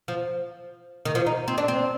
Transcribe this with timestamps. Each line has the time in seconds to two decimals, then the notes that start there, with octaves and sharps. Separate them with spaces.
0.08 F3
1.05 D#3
1.15 F3
1.26 D#4
1.48 C4
1.58 D4
1.68 C4